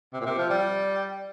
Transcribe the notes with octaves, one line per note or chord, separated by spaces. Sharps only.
C3
A#2
C3
F3
G3